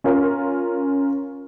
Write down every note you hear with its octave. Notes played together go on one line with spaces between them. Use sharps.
C#4 F4 A#4